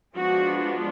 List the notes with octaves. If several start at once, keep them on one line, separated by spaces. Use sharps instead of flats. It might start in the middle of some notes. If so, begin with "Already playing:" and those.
F3 G#3 B3 D4 F#4